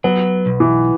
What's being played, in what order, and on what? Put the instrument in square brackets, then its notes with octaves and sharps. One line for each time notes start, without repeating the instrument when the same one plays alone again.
[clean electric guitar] F#3 [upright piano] B3
[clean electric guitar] B1
[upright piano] E3